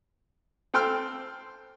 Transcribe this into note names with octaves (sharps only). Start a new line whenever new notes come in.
C4 A4 G5 C6 E6 F6